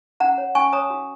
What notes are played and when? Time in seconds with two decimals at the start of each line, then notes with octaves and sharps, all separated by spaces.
0.20 C#4 F#5 A#5
0.38 C#5
0.55 C#4 G#5 C#6
0.73 C#5 A#5 D#6
0.90 F#4